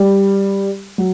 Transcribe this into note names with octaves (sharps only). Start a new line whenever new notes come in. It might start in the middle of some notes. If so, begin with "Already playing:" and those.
Already playing: G3
F#3